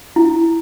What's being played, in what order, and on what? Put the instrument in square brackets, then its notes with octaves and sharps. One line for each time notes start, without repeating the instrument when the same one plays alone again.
[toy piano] E4